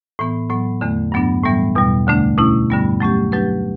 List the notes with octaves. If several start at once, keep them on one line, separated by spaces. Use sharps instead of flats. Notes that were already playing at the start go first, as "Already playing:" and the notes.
A2 E3 B3
A2 F#3 B3
E2 D3 A3
G2 F#3 B3 D4
A2 E3 G3 B3
E2 B2 G3
D2 D3 A3 D4
B2 A3 C#4 E4
G2 D3 G3 B3
F#3 A3 C#4 G4
F#3 A3 D4 G4 B4